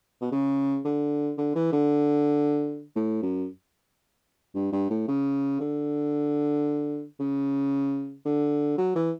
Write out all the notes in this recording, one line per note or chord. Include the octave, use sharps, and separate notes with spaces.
B2
C#3
D3
D3
E3
D3
A2
F#2
G2
G2
A2
C#3
D3
C#3
D3
F#3
E3